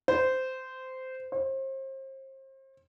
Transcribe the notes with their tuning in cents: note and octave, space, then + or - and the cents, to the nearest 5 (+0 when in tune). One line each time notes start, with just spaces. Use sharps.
C5 -15
C5 +35